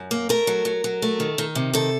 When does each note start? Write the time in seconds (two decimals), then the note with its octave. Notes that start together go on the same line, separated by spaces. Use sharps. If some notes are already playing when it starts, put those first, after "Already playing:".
Already playing: F#2
0.11 A#3
0.29 A3 A#4
0.47 F#3
0.65 F#3
0.84 F#3
1.02 A3
1.20 D#3
1.38 D#3
1.55 C3
1.73 D#3 A4